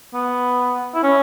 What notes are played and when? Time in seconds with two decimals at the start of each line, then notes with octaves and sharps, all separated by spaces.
0.14 B3
0.94 E4
1.03 C#4